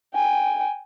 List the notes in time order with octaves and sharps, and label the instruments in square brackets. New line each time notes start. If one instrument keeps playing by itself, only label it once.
[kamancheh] G5 G#5